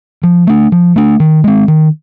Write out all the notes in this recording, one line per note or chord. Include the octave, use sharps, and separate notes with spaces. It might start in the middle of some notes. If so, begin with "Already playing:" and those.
F3
A3 D4
F3
A3 D4
D#3
G#3 C4
D#3